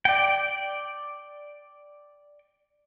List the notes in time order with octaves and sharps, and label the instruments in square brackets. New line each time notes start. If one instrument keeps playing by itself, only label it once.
[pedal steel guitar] D5 G5